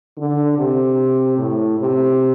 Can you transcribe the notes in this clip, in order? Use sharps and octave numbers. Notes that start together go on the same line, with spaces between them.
D3
C3
A2
C3